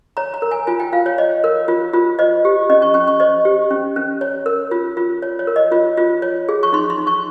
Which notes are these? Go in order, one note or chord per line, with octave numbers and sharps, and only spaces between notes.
C#5 A#5
A#5
A#4
G#5
F4 G#5
G5
F4 F5
C#5
C#5 D#5
A#4
F4
F4
C5 D#5
G4
C#4 D#5
C#6
C#4 C#6
C#6
C5 D#5
G4
C#4
C#4
C#5
A#4
F4
F4
C#5
C#5
A#4
D#5
F4
F4
C#5
G#4
C#6
D#4 C6
C6
D#4
C#6